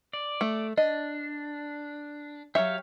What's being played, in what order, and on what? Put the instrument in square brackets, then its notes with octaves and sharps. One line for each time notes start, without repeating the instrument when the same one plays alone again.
[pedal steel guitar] D5
[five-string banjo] A3
[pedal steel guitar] D4 [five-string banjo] D#5
[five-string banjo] F#3 E5 [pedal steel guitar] G4 C#5 F5